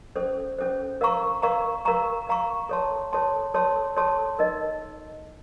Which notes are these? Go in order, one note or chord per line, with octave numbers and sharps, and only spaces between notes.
C#4 A4 C5
C#4 A4 C5
A#4 F5 A#5 C#6
A#4 F5 A#5 C#6
A#4 F5 A#5 C#6
A#4 F5 A#5 C#6
A4 C#5 A5 C6
A4 C#5 A5 C6
A4 C#5 A5 C6
A4 C#5 A5 C6
D#4 A#4 D#5